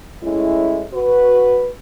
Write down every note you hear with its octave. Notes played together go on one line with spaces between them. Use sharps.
A2 G#3 C#4 E4
F#4 B4